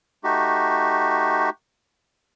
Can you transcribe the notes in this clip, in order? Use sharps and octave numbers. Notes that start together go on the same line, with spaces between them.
A3 D#4 F#4 G4